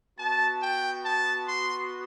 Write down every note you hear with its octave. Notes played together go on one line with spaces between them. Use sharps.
B3 F#4 A5
G5
A5
C6